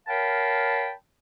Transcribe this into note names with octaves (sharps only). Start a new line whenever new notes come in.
A#4 C#5 F5 G5 A5 B5